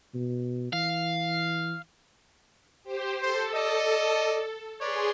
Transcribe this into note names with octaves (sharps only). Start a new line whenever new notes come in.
B2
E3 F5
G4 C5
A4 C5
D5 D#5
G#4 B4 C#5 D5 C6